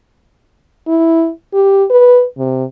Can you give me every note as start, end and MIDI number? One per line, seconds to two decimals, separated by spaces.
0.87 1.30 64
1.54 1.85 67
1.90 2.25 71
2.38 2.65 48